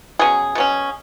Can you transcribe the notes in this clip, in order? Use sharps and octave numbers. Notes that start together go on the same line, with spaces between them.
B2 F#3 C#4 G#4
B2 F#3 C#4